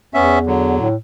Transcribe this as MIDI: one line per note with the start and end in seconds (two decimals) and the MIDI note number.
0.14 0.77 40
0.14 0.39 59
0.14 0.39 61
0.14 0.39 76
0.46 0.88 50
0.46 0.88 54
0.80 0.95 45